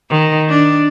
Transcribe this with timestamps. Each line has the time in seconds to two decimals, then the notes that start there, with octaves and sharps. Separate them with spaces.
0.10 D#3
0.50 D4